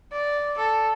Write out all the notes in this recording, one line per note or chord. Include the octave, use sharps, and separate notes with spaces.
D5
A4